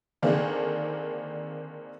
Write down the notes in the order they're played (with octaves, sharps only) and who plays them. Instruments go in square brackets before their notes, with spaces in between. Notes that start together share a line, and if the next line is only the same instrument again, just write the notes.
[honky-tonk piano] D3 D#3 A#3 C4 D4 G#4